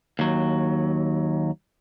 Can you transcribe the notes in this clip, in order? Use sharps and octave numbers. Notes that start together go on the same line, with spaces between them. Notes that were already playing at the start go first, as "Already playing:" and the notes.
D#2 F#3